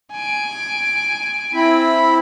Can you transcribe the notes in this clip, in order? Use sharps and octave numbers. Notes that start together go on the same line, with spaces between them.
G#5 D7
C4 E4 B5